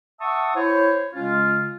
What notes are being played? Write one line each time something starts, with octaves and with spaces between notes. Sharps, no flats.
E5 F#5 A5 C#6 D#6 E6
E4 C5 C#5
C#3 G#3 C#4 F4